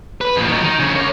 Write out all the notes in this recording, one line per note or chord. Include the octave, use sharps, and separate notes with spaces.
B4
F2 A#2
D#3 F#3
D#3
F2 C#3
A#4 C#5